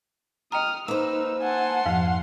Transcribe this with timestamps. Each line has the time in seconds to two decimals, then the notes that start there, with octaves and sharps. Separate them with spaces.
0.52 D#5 G5 A#5 D#6 F6
0.88 A#3 D#4 B4 C5 E6
1.42 F#5 G#5 A5 C6
1.86 F2 G#2 F3 F5